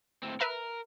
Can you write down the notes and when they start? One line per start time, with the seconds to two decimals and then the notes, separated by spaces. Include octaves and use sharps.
0.23 A2 C4
0.40 A#4 B4 E5 A#5